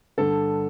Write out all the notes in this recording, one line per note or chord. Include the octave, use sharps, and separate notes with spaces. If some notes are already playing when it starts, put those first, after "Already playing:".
G2 D3 A4